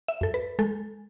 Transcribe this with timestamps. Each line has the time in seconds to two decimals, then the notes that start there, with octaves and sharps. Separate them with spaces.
0.08 E5
0.21 F#2 A4
0.34 B4
0.59 G#3 A4